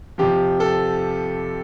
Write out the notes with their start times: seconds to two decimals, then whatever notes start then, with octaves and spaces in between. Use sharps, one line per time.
0.18 F2 C3 F3 G4
0.60 A4